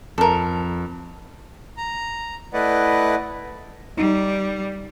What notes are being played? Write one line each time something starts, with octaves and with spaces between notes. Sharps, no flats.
F2 A4 A#4
A#5
A3 E4 B4 D5 D#5 F#5
G3 D#4